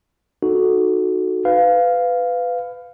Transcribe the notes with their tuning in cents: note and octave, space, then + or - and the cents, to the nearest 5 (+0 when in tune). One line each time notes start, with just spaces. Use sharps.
D#4 +0 F#4 +0 A4 -10
B4 +20 F5 +0